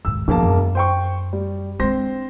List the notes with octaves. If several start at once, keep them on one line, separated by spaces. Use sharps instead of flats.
D#2 G#2 E6
E1 F3 A#3 A5
F#2
C5 G5 C#6
G3
G#3 C4 D4 C5 A#6